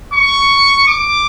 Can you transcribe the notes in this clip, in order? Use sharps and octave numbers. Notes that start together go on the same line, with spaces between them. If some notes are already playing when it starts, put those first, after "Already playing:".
C#6
D6